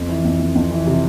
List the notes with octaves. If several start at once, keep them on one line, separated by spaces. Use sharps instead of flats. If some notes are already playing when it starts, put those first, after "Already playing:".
Already playing: F2
E3
F2
F2
F2
E3
C3